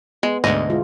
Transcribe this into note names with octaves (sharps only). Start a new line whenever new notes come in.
G#3 B3
D2 G#2 B2 D3 D#5
G#3 E4 F4